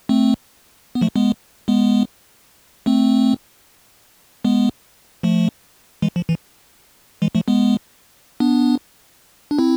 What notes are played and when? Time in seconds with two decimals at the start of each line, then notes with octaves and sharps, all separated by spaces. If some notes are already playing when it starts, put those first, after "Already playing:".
0.09 A3 C4
0.95 B3
1.01 F3 A3
1.16 G#3 B3
1.68 G#3 B3
2.86 A3 C4
4.45 G#3 B3
5.23 F3 A3
6.02 E3 G#3
6.16 F3
6.29 E3
7.22 E3 G#3
7.35 F3 A3
7.48 G#3 B3
8.40 B3 D4
9.51 D4
9.59 C4 E4